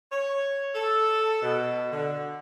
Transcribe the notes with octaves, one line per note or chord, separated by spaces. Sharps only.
C#5
A4
B2
D3